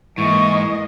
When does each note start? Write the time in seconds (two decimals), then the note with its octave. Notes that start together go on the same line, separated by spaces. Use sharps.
0.18 G#2 E3 G#3 A#3 D#5 C#6